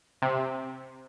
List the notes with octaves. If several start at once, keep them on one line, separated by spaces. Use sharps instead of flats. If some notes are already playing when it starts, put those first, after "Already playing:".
C3